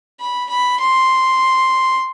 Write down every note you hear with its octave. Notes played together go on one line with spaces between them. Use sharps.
B5
B5
C6